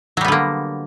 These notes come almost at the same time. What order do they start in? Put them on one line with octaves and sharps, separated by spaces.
F#3 G3 B3 D3 A#3